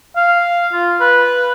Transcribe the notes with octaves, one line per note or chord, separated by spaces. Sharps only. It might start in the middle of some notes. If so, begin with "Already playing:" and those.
F5
F4
B4